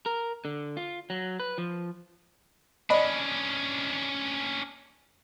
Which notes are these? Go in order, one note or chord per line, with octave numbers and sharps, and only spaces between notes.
A#4
D3
F4
F#3
B4
F3
C#4 D4 D5 D#5 B5